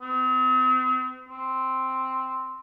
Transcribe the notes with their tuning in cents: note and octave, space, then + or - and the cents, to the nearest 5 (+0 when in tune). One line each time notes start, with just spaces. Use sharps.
C4 -40
C4 +0